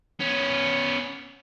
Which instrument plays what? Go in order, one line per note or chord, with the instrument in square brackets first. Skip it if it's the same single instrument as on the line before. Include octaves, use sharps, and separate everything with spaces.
[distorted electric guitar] B3 C#4